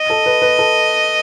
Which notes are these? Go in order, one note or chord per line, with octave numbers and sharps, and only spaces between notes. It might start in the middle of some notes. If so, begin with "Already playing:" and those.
Already playing: D#5
A4
B4
B4
A4